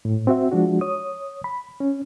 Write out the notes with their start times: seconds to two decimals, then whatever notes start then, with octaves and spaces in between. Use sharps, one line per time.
0.05 A2
0.27 C4 F#4 E5
0.52 F3 G#3 D4 F#4
0.81 C#5 D#6
1.44 B5
1.80 C#4